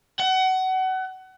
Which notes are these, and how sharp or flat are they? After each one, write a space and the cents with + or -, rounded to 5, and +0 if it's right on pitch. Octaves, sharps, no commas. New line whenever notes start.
F#5 +25